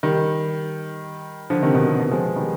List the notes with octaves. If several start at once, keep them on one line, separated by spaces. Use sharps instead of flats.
D#3 G3
D3 F3
C3 D#3
B2 D3
C3
B2
F3 G#3
D#3 G3